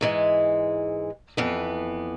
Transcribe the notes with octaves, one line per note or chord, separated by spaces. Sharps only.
G#2 E3 G#3
F2 E3 B3